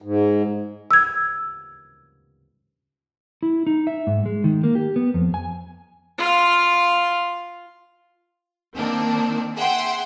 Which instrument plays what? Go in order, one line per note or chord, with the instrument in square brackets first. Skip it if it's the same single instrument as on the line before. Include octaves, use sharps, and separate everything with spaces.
[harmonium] G#2
[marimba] E6 G#6
[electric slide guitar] E4
D#4
E5
G#2
G#3
D#3
A#3
G4
B3
F2
G#5
[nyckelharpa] F4 F5
[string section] D#3 A#3 C4 D4
G#4 E5 F#5 G5 C6 C7